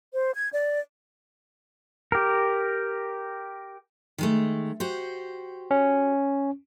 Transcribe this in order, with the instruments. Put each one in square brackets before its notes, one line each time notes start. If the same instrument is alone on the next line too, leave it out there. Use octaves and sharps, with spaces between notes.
[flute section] C5
G#6
D5
[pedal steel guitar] G4 A#4
[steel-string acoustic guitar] D#3 G#3 A3
F#4 G4 C5
[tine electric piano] C#4